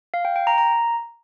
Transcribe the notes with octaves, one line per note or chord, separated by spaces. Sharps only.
F5
G5
G5
A#5
A#5